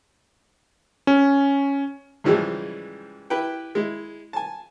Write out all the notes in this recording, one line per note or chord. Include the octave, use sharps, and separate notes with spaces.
C#4
G#2 C#3 E3 F3 G3 G#3
E4 G4 B4 G5
G#3 E4
G#5 A5